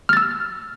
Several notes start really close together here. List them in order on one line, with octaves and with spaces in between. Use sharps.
F6 A6 E6